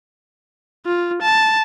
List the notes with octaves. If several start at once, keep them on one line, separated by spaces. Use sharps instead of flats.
F4
A5